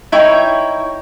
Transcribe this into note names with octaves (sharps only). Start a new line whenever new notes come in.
D#4 E4 C#5 G5